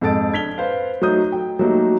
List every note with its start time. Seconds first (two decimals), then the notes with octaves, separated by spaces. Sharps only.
0.01 F2 G#2 A4 A5 A6 D7
0.33 D4 G#6 B6 F7 G7
0.58 B4 C5 F5
1.02 F#3 A3 D#4 D#6 G6
1.32 G5
1.59 F#3 G3 A3 A#3 D#4 G4